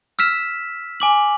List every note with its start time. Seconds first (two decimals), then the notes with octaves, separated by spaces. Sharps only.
0.19 E6 F6 B6 E7
1.00 G#5 D6 F#7